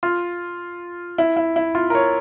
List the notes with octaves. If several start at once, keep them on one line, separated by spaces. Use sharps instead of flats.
F4
E4
E4
E4
F4
A#4
C#5